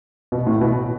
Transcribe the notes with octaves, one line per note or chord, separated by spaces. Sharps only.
B2
A2
B2